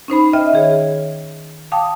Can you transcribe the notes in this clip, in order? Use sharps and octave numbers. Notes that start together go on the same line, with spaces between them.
C#4 D#4 C5 B5
C5 D#5 E5 G5 F6
D#3 G#4 C#5
F5 G5 A5 D6 D#6